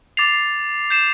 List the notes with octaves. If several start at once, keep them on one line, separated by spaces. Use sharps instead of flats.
D6 A6 C7 F7
G6 C7 E7